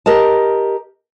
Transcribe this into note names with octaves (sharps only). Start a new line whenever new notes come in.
G4 A#4 D#5 A5